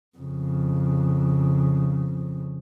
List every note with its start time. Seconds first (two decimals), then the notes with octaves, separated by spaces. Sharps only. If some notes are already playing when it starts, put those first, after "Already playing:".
0.17 F2 C#3